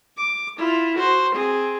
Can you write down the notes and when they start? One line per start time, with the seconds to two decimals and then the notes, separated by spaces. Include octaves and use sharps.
0.18 D6
0.58 E4 F4
0.97 F#4 C5
1.35 C4 G#4